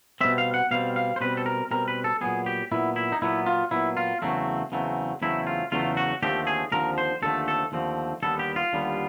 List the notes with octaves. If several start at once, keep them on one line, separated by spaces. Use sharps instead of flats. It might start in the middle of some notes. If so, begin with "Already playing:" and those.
B2 G3 C4 E5
F5
F#5
B2 G3 C4 F5
F5
C5
B2 G3 C4 B4
A4
A#4
B2 G3 C4 A#4
B4
A4
A#2 F#3 B3 G#4
G4
A#2 F#3 B3 E4
E4
D#4
A#2 F#3 B3 E4
F4
A#2 F#3 B3 E4
F4
E2 C#3 F#3 A3 C4
E2 C#3 F#3 A3 C4
E2 C#3 F#3 A3 C4 E4
F4
E2 C#3 F#3 A3 C4 F4
F#4
D#2 D3 F3 A3 C4 G4
G#4
D#2 D3 F3 C4 A#4
C5
D#2 D3 F3 A3 C4 A4
A4
D#2 D3 F3 A3 C4
D#2 D3 G3 B3 A4
G4
F4
D#2 D3 G3 B3